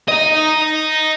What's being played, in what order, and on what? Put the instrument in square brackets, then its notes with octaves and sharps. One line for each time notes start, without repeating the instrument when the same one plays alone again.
[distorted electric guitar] D#5 A#5